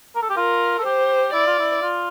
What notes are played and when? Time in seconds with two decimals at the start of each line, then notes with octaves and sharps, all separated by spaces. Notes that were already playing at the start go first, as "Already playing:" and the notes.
0.16 A#4
0.22 A4
0.30 G4
0.37 F4 A#4
0.78 A4
0.85 G4 C5
1.33 E4 D5
1.47 F4
1.59 E4
1.82 F4